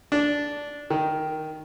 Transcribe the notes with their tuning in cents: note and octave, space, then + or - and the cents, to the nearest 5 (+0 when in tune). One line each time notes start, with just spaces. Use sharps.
D4 -10
D#3 +5